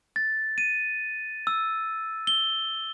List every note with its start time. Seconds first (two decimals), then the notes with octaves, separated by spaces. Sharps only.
0.16 A6
0.58 D#7
1.47 E6
2.27 G7